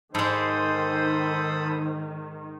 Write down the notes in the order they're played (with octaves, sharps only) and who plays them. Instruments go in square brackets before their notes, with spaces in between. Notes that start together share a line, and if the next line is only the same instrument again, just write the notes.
[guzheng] G#2 G#3 [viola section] D#3 [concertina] A4 B5 D#6 [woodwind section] C5